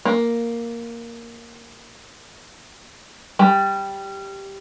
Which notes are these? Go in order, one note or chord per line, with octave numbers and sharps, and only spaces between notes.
A#3
G3